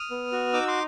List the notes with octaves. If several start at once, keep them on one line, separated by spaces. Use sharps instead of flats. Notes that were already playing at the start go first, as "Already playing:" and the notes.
Already playing: D#6 F6
B3
F#4
D#4 D6 E6
C6 D6